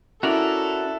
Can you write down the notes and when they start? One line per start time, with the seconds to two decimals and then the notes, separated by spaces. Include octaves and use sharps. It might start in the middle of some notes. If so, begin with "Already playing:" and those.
0.23 C#4 E4 F#4 A4 A#4 D5